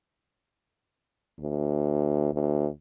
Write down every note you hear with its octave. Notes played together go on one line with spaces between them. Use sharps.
D2
D2